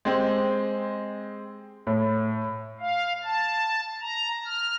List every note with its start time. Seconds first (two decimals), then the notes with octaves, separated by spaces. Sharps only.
0.05 G#3 C4 G4
1.87 A2
2.80 F5
3.24 A5
4.02 A#5
4.45 F6